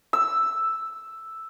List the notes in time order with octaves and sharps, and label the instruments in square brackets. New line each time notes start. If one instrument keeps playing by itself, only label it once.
[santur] E6